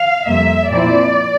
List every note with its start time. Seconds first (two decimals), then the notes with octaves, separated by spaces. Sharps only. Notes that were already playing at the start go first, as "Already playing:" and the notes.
Already playing: F5
0.27 F2 C3 G3 A#3 E5
0.71 A#2 F3 C4 E4 D5